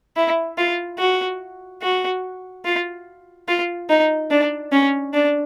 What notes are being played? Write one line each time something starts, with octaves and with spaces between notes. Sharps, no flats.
E4
F4
F#4
F#4
F4
F4
D#4
D4
C#4
D4